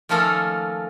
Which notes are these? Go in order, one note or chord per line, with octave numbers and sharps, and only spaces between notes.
D#3 F3 A3 A#3 C#4 A4